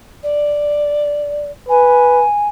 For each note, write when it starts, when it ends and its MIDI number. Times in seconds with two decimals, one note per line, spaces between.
0.23 1.50 74
1.68 2.25 71
1.68 2.47 80